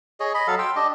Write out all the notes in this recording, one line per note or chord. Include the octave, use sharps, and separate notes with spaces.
G#4 C#5 D#5
D#5 B5
F#3 A4 F5
G5 C6 E6
D4 G4 D#5